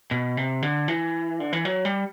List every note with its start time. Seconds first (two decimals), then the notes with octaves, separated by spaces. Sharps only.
0.11 B2
0.37 C3
0.62 D3
0.88 E3
1.40 D3
1.53 E3
1.65 F#3
1.85 G3